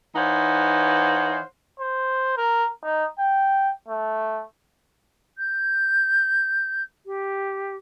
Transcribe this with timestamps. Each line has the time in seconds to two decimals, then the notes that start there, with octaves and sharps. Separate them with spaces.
0.16 E3 D#4 C5 C#5 F5 F#5
1.80 C5
2.37 A#4
2.83 D#4
3.19 G5
3.89 A3
5.38 G6
7.06 G4